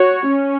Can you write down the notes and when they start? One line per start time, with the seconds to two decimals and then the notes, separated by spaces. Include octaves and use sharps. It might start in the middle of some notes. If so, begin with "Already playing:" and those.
Already playing: F#4 C#5
0.29 C#4